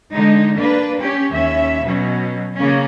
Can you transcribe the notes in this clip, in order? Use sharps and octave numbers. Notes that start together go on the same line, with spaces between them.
D3 G#3 D#4
A#3 D4 B4
C#4 G4
D#2 C#4 E5
B2 F#3 C#4
C#3 A#3 C#4